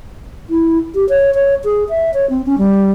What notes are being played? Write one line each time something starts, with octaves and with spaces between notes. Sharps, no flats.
E4
G4
C#5
C#5
G#4
E5
C#5
C4
C#4
G3